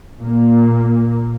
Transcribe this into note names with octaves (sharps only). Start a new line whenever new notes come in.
A#2 A#3